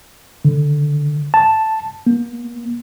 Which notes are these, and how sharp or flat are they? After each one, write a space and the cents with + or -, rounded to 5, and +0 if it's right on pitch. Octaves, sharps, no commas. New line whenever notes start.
D3 +0
A5 +0
A#3 +40